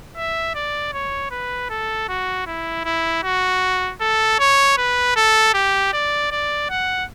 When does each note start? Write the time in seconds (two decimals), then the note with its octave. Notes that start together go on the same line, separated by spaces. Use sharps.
0.17 E5
0.55 D5
0.93 C#5
1.31 B4
1.70 A4
2.09 F#4
2.47 E4
2.85 E4
3.24 F#4
4.01 A4
4.40 C#5
4.78 B4
5.16 A4
5.54 G4
5.93 D5
6.31 D5
6.70 F#5